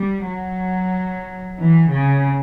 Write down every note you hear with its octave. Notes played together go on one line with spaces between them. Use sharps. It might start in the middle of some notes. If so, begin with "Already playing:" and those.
Already playing: G3
F#3
E3
C#3